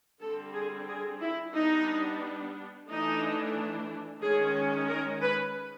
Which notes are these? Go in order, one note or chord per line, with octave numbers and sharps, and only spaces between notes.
D3 G3 C4 A4
G#4
G#4
E4
G3 B3 D4 D#4
E3 A3 D4 D#4
D#3 G#3 C#4 G#4
A#4
B4